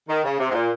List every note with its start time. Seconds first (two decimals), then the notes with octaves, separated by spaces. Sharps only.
0.09 D#3
0.24 C#3
0.39 C3
0.50 G#2
0.54 A#2